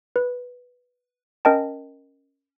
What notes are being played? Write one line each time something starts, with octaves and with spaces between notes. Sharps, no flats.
B4
C#4 A#4 D#5 G5 A5